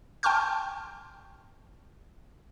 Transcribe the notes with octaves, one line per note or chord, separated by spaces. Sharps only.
G5 A5 C6 C#6 F6 G6